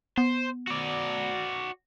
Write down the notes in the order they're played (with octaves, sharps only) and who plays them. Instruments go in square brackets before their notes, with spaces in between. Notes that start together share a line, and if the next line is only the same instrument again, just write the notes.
[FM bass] B3 [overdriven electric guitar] C5
[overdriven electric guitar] F#4 D5